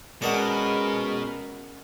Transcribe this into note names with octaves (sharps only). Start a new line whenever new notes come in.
B2 G#3 C#4 A#4 D5 D#5 F#5